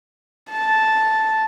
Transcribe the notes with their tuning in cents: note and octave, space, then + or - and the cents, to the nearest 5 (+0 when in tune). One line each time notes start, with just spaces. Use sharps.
A5 -5